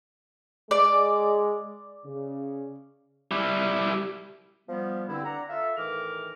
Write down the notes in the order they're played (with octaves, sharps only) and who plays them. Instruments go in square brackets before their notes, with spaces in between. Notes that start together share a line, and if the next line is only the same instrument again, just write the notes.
[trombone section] G#3 [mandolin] D5
[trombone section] C#3
[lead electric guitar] G3 E4
[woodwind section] F3 G3 B3
G2 D3 C4 E4
D4 F#5 A#5
F4 A4 E5
A2 D#3 E3 A#4 D6 F6